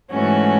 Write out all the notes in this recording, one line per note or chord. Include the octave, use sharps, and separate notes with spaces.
G#2 E3 A3 C#4 F#4